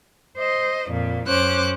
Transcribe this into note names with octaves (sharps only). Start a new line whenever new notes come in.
C5 D#5
F2 A#2
F#2 C#4 C5 D6 F#6